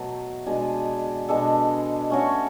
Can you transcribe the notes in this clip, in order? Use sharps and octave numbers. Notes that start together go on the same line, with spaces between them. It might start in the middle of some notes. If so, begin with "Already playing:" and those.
Already playing: B2 F#3 A3
B2 G#3 D4 G#4
B2 G#3 D4 A4
A3 C#4 F#4 C#5